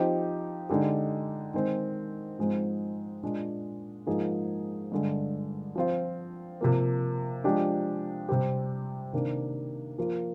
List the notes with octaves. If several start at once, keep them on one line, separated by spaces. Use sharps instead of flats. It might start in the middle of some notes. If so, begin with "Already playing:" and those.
Already playing: F3 C4 D#4 G4
D3 G#3 D#4 G4
D#3 G#3 C4
G#2 F3 G#3 C4 D#4
A#2 G#3 D4
G#2 F3 A#3 D#4 G#4
G2 D3 G#3
F3 C4 F4
C3 F3 A#3
F3 G#3 D4 G4
C3 G3 C4 G4
C3 D#3 A#3 D4
F3 A#3 F4